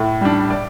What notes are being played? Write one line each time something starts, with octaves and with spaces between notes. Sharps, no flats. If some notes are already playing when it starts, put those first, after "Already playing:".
Already playing: A2
G3 D4
D5